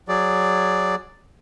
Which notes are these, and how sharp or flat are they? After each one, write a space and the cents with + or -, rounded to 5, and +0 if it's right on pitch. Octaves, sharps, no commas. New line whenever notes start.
F#3 -5 G#4 +0 D5 +0